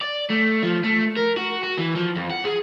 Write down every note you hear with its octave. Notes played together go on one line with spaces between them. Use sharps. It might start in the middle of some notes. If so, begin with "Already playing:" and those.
D5
A3
F3
A3
A#4
F#4
F#4
E3
F3
F2
F#5
G#4